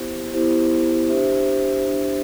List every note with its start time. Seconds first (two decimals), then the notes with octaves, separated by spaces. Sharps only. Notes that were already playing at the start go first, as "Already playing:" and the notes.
Already playing: B3 E4 G4 C5
0.32 B3 E4 G4 C5
1.09 D4 G4 C5 E5
1.85 D4 G4 C5 E5